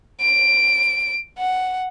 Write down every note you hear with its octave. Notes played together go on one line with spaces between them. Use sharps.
D7
F#5